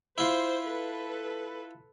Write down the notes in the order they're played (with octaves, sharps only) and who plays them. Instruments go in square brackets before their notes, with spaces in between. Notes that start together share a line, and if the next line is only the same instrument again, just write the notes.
[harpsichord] E4 F4 [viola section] C5
[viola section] A4 B4